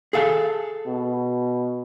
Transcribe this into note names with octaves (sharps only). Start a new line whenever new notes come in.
G#4 A4 F5
B2